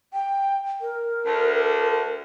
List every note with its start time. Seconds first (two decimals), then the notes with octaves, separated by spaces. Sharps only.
0.13 G5
0.81 A#4
1.25 D2